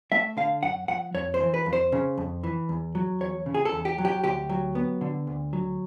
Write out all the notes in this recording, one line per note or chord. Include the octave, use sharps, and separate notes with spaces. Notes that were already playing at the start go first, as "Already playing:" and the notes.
A3 E5
D3 F5
F#2 F#5
F3 F#5
F2 C#5
C5
E3
B4
F2
C5
C#3
F2
E3
E2
F#3
E2 C#5
C#3
G#4
A4
E2
G4
F#3
G4
D2 G4
F#3
B3
D3
D2
F#3